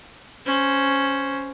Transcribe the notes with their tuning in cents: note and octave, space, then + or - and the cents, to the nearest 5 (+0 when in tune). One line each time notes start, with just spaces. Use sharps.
C#4 +0 C5 +0